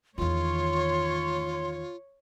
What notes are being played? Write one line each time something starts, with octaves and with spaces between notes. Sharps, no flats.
E2 D#3 F4 C#5 C6